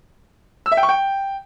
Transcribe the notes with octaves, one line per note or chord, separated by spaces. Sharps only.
E6
E5
G5
C#6
G5